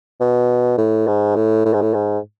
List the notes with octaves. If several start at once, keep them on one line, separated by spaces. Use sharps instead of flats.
B2
A2
G#2
A2
A2
G#2
A2
G#2